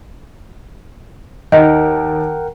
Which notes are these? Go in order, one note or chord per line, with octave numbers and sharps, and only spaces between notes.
D#2 D#3 A#4 D#5 F#5 G5